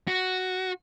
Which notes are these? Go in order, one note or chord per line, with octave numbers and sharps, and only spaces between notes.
F#4